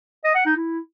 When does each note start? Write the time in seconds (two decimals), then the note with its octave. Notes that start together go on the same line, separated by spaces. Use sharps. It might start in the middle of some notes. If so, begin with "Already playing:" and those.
0.24 D#5
0.35 F#5
0.46 D#4
0.57 E4